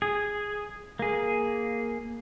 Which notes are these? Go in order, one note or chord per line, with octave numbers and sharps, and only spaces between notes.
G#4
A#3 G#4